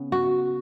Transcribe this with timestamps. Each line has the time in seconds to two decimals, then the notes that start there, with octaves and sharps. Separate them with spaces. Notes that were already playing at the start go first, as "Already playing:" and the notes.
Already playing: C#3 B3
0.12 F#4